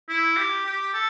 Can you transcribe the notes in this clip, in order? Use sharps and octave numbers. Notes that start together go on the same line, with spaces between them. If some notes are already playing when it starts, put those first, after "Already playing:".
E4
G4
G4
A4